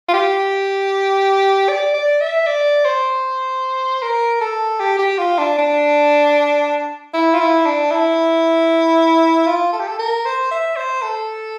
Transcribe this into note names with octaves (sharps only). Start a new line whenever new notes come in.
F4
G4
D5
D5
E5
D5
C5
A#4
A4
G4
G4
F4
D4
D4
E4
F4
E4
D4
E4
F4
A4
G4
A4
A#4
C5
E5
C5
A4